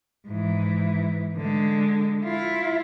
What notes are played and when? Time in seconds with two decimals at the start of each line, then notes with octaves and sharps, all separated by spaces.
0.26 G#2 E3
1.37 D3 G#3
2.24 E4 F4